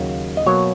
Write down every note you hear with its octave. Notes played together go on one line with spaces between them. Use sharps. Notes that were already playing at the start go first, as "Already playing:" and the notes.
Already playing: D#2 C#3 F#3 A#3
D#5
B2 F#3 A#3 C#5